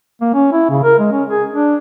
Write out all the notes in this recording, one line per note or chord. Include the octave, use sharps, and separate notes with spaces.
A#3
C#4
E4
C#3
A#4
G#3
C#4
G#4
D4